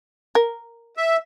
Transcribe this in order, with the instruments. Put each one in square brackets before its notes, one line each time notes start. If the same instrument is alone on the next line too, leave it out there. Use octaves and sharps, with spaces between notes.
[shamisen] A#4
[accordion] E5